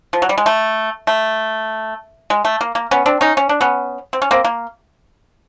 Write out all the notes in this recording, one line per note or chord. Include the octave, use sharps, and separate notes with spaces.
F3
F#3
G3
G#3
A3
A3
G#3
A3
A#3
A#3
B3 C#4
C4 D4
C#4 D#4
C#4
D4
B3 C#4
C4
C#4
A#3 C4
A#3